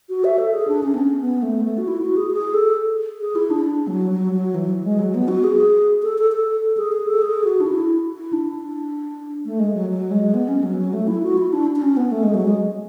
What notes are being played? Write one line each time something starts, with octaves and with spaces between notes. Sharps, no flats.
F#4
E5
A4
G#4
D4
C#4
B3
C#4
B3
A3
A3
F#4
E4
F#4
G#4
G#4
A4
G#4
E4
D4
D4
F#3
F#3
F#3
E3
F#3
G#3
F#3
B3
F#4
G#4
A4
A4
A4
G#4
G#4
A4
G#4
F#4
D4
E4
E4
D4
A3
G#3
F#3
F#3
G#3
B3
C#4
F#3
F#3
A3
E4
F#4
E4
D4
D4
C#4
B3
A3
G#3
F#3
G#3